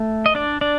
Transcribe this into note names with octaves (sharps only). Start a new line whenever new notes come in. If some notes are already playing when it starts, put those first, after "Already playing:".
Already playing: A3
D#5
D4 D5
D4 D5